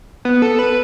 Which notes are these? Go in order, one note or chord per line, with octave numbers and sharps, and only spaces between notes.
B3
A4
B4